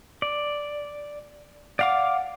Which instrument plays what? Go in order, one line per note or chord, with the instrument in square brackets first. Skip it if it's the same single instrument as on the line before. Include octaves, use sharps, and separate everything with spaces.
[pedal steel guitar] D5
[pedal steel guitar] D5 F5 D6 [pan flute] F#5